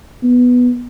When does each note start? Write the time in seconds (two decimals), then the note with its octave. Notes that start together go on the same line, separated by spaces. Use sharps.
0.23 B3